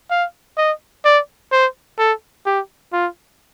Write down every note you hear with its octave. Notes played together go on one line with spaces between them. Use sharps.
F5
D#5
D5
C5
A4
G4
F4